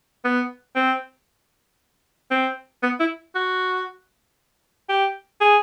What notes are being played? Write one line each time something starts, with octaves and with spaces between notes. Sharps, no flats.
B3
C4
C4
B3
E4
F#4
G4
G#4